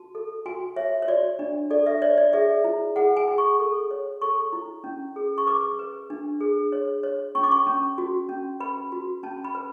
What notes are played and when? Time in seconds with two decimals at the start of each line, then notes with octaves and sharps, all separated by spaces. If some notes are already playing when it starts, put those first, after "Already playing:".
Already playing: F#4 A5
0.15 A4
0.46 F#4 G#5
0.76 C#5 E5
1.02 C#5
1.08 F#4 D5
1.39 D4
1.70 A4 D5
1.86 E5
2.02 C#5 D5
2.18 D5
2.33 G#4 E5
2.64 E4
2.96 G#4 F#5
3.17 G#5
3.28 G#4
3.38 C#6
3.60 A4
3.91 C#5
4.21 A4 C#6
4.53 E4
4.84 C#4
5.16 G#4
5.38 C#6
5.47 B4 D6
5.79 B4
6.10 D4
6.41 G#4
6.72 C#5
7.03 C#5
7.35 C#4 C#6
7.43 D6
7.52 C#6
7.67 C#4
7.98 F#4
8.29 C#4
8.60 B4 B5
8.92 F#4
9.23 C#4 A5
9.45 B5
9.55 B4